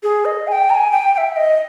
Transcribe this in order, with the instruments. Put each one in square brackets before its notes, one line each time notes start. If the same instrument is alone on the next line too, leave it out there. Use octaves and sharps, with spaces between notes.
[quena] G#4
D#5
G#5
G5
A#5
G#5
G5
G5
E5
D#5